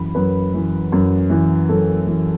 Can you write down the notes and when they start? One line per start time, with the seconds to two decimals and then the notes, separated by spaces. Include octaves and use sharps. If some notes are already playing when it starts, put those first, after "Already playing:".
Already playing: F#2 E3 B5
0.15 F#2 B4
0.54 E3
0.92 F#2
1.30 E3
1.69 F#2 A4
2.07 E3